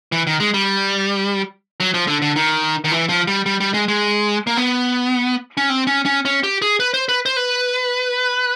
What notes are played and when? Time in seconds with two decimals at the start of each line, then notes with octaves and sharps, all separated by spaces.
0.12 E3
0.27 D#3
0.40 G#3
0.54 G3
1.80 F#3
1.94 F3
2.07 D3
2.22 D3
2.36 D#3
2.84 D#3
2.91 E3
3.09 F3
3.27 G3
3.46 G3
3.60 G3
3.74 G#3
3.88 G#3
4.47 A#3
4.57 B3
5.57 C#4
5.70 C4
5.87 C#4
6.06 C#4
6.25 C#4
6.44 G4
6.62 G#4
6.80 B4
6.94 C5
7.09 B4
7.26 C5
7.37 B4